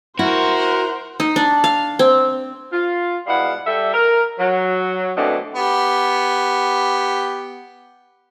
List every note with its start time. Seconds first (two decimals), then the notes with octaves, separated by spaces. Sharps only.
0.19 E4 F#4 A#4 C5
1.20 D#4
1.36 D4
1.64 F5
1.99 C4
2.73 F4
3.27 G#2 B2 G3 E4 F5 F#5
3.66 G3 A4 E5
3.94 A#4
4.39 F#3
5.17 F#2 B2 E3 A3 C4 D4
5.55 B3 G4